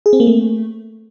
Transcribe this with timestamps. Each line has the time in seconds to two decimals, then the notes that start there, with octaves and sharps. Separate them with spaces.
0.06 G#4
0.13 C4
0.20 A#3
0.27 A3